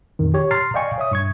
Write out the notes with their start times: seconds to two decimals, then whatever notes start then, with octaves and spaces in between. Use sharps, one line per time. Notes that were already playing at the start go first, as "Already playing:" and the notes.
0.19 A#1 F2 D#3
0.34 G4 C#5
0.51 A#5 C6 F6 A6 C7
0.74 D5 D#5 F5 G5 G#5 C#6
0.98 C#5 E5 D#6
1.11 G2 C#6 G#6